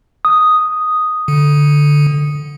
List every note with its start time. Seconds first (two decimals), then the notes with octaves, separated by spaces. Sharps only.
0.25 D#6
1.28 D3